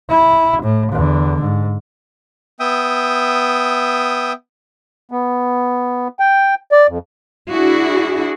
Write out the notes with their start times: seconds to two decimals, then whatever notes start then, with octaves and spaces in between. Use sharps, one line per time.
0.10 E4
0.63 A2
0.93 E2 D3
1.42 G#2
2.60 B3 E5 G5 D#6
5.12 B3
6.20 G5
6.72 D5
6.88 F2
7.49 D4 E4 F#4 G#4